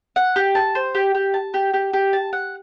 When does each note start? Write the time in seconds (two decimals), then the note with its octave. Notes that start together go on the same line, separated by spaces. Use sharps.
0.16 F#5
0.36 G4
0.55 A5
0.75 C5
0.95 G4
1.15 G4
1.34 A5
1.54 G4
1.74 G4
1.93 G4
2.13 A5
2.33 F#5